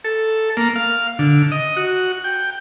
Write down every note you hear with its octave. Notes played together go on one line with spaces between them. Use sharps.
A4
A#3
F5
D3
D#5
F#4
G5